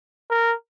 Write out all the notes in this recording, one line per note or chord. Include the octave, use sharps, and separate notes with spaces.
A#4